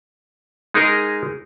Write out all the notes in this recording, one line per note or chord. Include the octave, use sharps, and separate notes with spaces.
G#3 D#4 G#4 A#4 D#5